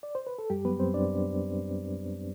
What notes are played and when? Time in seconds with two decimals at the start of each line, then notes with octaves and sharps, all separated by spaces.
0.03 D5
0.15 C5
0.27 B4
0.39 A4
0.50 F#2 G3 G4
0.65 F#3 B3 B4
0.79 F#2 C4 C5
0.94 F#2 D4 D5